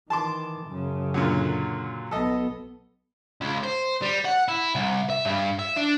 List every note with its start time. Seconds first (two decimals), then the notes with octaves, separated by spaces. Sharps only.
0.10 D#3 E3 A5 C6 D6
0.67 F#2 C#3
1.14 A#2 D3 F#3
2.11 B1 B3 A4 D#5
3.41 C#2
3.63 C5
4.02 G3
4.25 F#5
4.48 E4
4.75 C2
5.10 E5
5.25 G2
5.59 E5
5.76 D4